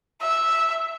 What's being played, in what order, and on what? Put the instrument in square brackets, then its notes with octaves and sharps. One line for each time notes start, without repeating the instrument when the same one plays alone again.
[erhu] E5